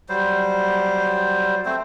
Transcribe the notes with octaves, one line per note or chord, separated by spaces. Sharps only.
F#3 G3 C5
A3 C4 C5